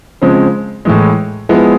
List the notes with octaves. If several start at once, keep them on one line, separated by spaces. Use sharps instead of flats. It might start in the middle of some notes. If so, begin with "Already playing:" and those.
C#3 F3 G#3 C4
A2 E3 G#3
F3 G#3 B3 E4 G#4